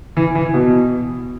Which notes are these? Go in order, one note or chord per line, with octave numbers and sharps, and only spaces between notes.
E3
E3
B2